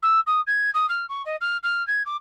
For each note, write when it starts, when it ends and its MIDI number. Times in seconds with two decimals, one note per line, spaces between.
0.02 0.20 88
0.26 0.41 87
0.47 0.70 92
0.74 0.86 87
0.89 1.05 89
1.09 1.22 85
1.25 1.36 75
1.41 1.57 89
1.63 1.85 89
1.87 2.03 92
2.06 2.16 86